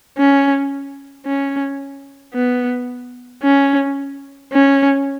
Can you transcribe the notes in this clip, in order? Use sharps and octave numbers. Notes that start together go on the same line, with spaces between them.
C#4
C#4
B3
C#4
C#4